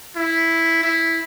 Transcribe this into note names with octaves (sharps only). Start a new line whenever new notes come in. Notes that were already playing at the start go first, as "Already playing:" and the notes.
E4
E4